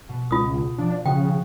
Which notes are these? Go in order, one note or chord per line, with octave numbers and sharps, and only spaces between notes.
B2 B3
C#2 F4 D#6
F3 D4 G#4
C#3 F#4 G5 D#6